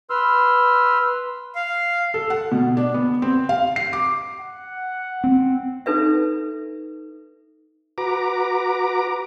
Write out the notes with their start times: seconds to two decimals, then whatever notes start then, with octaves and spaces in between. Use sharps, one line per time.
0.10 B4 C6 E6 F6
1.55 F5
2.14 A4
2.30 F#5
2.52 B2
2.77 D4
2.94 B3
3.22 C4
3.49 F5
3.76 C7
3.93 D6
4.39 F#5
5.24 C4
5.86 D#4 A4 B4 E5
7.98 F#4 B4 A#5 D6